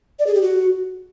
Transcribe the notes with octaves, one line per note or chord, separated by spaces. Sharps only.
D5
G#4
G4
F#4